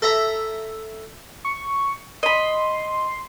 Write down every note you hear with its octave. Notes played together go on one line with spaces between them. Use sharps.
A4 E5 A#5
C#6
D#5 B5 C6